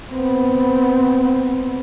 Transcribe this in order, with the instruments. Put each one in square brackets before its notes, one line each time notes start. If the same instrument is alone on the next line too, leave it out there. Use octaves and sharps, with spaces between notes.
[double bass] B3 C4